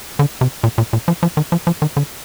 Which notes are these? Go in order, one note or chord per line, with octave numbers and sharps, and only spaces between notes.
D3
C3
A#2
A#2
A#2
F3
F3
D#3
F3
F3
D#3
D3